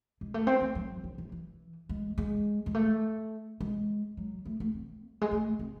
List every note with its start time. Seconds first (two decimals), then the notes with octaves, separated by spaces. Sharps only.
0.21 G#3
0.34 A3
0.47 C4
0.61 A3
0.75 F#3
1.04 F#3
1.18 E3
1.32 E3
1.89 G#3
2.18 G#3
2.66 G#3
2.75 A3
3.60 G#3
4.17 F#3
4.46 A3
4.60 A3
4.74 C4
5.12 F#3
5.21 G#3
5.31 A3
5.59 C4